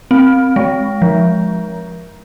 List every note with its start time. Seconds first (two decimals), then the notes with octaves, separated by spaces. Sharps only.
0.11 C4
0.56 G#3
1.02 F3